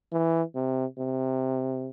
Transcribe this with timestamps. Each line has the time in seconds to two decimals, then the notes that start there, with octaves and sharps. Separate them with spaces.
0.12 E3
0.55 C3
0.98 C3